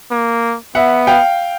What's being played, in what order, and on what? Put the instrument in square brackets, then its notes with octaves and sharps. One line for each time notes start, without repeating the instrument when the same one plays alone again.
[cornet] A#3
[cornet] B3 [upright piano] E5 F#5
[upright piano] F5 G5